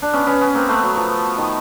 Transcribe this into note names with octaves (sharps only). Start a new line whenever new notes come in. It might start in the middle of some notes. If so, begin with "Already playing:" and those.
D4
B3 C#4
B3 C#4
B3 C#4
A#3 C4
A3 B3
F#3
F3
D#3